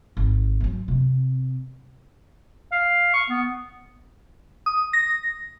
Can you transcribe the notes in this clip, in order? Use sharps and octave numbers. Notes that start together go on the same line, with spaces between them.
G#1
E3 F#3
C3
F5
C#6
B3
D#6
A#6